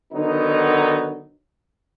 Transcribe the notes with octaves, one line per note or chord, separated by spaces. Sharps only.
D3 D#3 F#3 B3 D#4